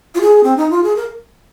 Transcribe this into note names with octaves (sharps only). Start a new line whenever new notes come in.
F4
G#4
C4
D#4
F4
G#4
A#4